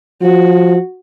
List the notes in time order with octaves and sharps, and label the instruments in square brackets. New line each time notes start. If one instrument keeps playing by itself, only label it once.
[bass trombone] F3 [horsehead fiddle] F#4